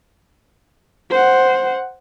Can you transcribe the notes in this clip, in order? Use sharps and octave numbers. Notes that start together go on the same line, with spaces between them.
C5 F#5